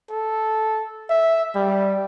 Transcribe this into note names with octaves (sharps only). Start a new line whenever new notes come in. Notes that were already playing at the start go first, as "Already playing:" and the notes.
A4
E5
G3